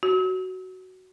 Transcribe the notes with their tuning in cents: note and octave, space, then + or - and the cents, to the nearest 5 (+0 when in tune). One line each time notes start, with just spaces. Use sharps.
F#4 +10